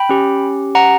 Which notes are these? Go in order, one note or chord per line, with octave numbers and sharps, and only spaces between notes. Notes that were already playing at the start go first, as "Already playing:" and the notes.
Already playing: G5 B5
C#4 G4
F#5 A#5